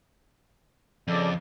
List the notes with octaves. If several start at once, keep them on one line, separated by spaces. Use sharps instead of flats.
F2 C#3 A4 D5